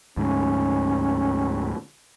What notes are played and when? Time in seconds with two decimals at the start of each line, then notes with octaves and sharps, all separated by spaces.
0.17 D2 G#2 C#4